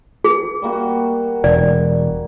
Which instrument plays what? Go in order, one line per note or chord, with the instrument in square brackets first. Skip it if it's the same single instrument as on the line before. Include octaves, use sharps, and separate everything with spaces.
[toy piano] G#4
[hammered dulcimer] G3 A#3 F#4
[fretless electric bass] E1 [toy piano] D5